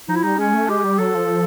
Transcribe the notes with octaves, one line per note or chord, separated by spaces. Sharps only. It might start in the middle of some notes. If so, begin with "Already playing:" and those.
F3 D#4
E4
G3 D#4
G#3 C#4
A3
G#3 G4
G3
F#3 A4
F3